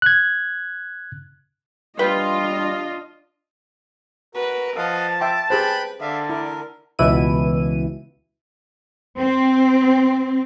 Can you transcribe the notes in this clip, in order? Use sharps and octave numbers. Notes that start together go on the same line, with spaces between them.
F#6 G#6
G3 D4 F4 B4 D#5 G5
F#4 A#4 B4
F3 D#5 F5 F#5 A5
E5 G5 C6 D6
G4 G#4 B4 C5 G5 B5 F#6
D3 D5 E5 F5
E4 A#4
C#2 B2 E3 E4 D#7
C4